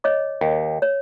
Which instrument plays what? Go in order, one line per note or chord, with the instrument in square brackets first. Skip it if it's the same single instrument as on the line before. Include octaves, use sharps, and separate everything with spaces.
[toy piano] C#5 D#5 D6
[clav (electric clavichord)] D#2
[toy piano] C#5